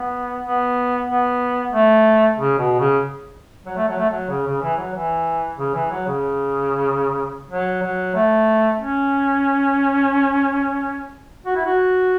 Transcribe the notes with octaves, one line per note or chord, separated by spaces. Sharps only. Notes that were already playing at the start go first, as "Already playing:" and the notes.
Already playing: B3
B3
B3
A3
C#3
B2
C#3
F#3
A3
F#3
A3
F#3
C#3
C#3
E3
F#3
E3
C#3
E3
F#3
C#3
F#3
F#3
A3
C#4
F#4
E4
F#4